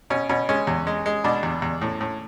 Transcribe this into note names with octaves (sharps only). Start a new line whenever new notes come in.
B2 C#4
B2 C#4
G#3 C#4
E2
G#3
G#3
B2 D4
E2
E2
A2
A2